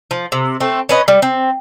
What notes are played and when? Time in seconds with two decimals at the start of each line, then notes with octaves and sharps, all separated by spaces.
0.11 F3
0.32 C3
0.60 A3 C4
0.89 C#4 B4 D#5
1.08 G3
1.22 C4